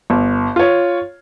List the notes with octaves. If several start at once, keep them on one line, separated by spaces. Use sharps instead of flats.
G1
F4 C#5